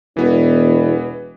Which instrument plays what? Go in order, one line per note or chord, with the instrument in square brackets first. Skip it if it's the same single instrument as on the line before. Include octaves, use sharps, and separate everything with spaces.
[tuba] E1 [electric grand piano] E3 B3